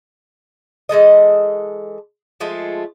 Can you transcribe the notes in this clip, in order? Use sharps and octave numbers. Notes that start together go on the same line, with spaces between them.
E3 G#3 A4 D#5
F3 G#3 A3 F4